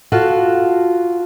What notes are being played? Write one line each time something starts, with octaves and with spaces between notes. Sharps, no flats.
F4 F#4 A4